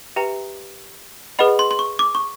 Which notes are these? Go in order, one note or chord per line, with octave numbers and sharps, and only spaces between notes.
G4 B4 E5 G5 A#5
G#4 B4 D#5 F#5 B5
C6
C6
C#6
D6
C#6